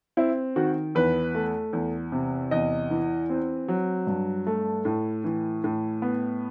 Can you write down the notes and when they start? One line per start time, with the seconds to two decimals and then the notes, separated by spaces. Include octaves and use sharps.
0.17 C4 E4
0.56 D#3 F#4
0.95 E2 B4
1.35 A3
1.73 E2
2.12 C3
2.51 E2 D#5
2.90 E3
3.30 C4
3.68 F#3
4.07 G2
4.46 A3
4.85 A2
5.24 E3
5.64 A2
6.02 B3